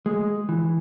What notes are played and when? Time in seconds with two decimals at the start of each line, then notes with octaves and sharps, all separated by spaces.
0.06 G#3
0.49 E3